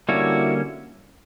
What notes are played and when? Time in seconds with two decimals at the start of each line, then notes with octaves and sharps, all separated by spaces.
0.09 D3 G3 A#3 C#4 E4 F#4